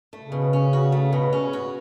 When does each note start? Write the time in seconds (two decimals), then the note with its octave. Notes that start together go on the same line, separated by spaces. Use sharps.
0.13 A3
0.22 C#3
0.32 B2
0.53 C#4
0.73 F#4
0.92 A3
1.13 B2
1.33 C#4
1.53 F#4